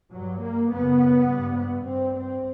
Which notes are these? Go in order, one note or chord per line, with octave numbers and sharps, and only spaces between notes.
G2 F#3
A#3
F#2 C#3 B3
G2
B3
G2 C4
C4